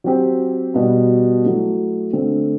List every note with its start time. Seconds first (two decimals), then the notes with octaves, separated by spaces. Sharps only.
0.04 F#3 C4 G4
0.74 B2 G3 B3
1.44 F#3 A3 E4
2.13 D3 A3 C4